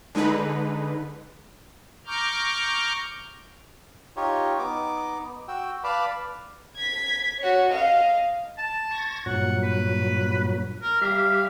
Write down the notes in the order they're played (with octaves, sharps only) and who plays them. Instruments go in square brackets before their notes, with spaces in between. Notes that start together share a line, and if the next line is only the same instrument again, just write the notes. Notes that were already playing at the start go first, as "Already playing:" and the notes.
[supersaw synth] D3 G#3 D#4 B4
[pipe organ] A#5 C#6 D6 F6 G6
[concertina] D#4 F4 G4 C#5
B3 D#4 D6
F#4 G5 E6
B4 D5 F5 A5 B5 D6
[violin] G#6 B6
F#4 C#5
D#5 F5
[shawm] A5
[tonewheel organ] C#6 G#6 A#6
[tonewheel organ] G2 A#2 F#3 [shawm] F#5
[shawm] B4
A#4
[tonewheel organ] G3 G4 E5 [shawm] F5